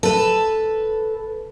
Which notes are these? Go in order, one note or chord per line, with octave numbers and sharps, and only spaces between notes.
A4 B4